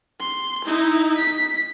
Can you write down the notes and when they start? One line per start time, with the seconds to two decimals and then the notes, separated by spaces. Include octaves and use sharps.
0.20 C6
0.65 D#4 E4
1.18 B6